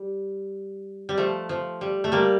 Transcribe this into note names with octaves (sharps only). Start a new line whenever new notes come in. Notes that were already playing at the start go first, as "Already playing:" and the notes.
Already playing: G3
G3
F3 A3
F3
G3
A3
G3 A#3